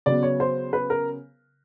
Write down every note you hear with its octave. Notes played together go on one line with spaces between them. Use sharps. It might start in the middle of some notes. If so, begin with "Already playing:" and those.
C#3 F#3 B3 D5
C#5
C5
B4
A#4